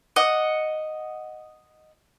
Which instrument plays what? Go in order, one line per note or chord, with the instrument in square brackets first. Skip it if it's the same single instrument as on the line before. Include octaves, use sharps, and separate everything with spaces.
[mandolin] D#5 F#5